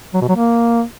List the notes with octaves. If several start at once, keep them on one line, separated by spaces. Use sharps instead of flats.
F#3
B2
F#3
A#3